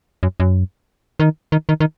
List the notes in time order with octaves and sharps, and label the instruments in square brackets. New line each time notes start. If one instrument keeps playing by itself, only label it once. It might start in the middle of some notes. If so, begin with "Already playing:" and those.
[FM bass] F#2
F#2
D#3
D#3
D#3
D#3